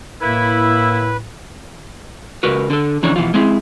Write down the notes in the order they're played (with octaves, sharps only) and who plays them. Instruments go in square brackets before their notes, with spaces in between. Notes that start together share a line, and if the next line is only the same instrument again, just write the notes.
[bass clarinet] A2 [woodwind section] A#3 E4 [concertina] B4
[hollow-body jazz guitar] C#2 F#4 A#4 B4
D3 A4
F2 C#3 E3 D4 C#5 A#5
B2 E3 F3 F4
G#3 C4 E4